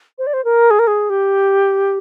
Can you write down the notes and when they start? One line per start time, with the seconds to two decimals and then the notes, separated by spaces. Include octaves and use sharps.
0.18 C5
0.27 D5
0.33 C5
0.45 A#4
0.71 G#4
0.79 A#4
0.87 G#4
1.10 G4